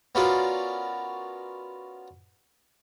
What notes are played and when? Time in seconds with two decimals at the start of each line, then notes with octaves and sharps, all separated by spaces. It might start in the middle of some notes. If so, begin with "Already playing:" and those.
0.15 B3 C#4 F4 F#4 A#4 D5